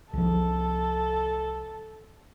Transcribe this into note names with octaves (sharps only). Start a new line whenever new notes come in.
C2 F3 A4